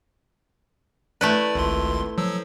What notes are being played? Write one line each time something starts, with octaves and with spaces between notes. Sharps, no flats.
A3 E4 B4 D5
G#1 C#2 C6
F3 F#3 E6